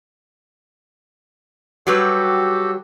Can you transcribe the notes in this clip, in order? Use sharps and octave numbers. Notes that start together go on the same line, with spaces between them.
F#3 G3 F#4 G4 A4 B4